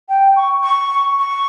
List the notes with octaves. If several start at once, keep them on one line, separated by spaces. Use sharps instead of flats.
G5
C#6
C#6
C#6